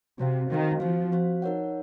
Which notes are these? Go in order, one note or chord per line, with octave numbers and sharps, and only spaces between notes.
C3 C4 F#4 C5 F5
D#3 C4 F#4 C5 F5
F3 C4 F#4 C5 F5
C4 F#4 C5 F5
D#4 A#4 C#5 F#5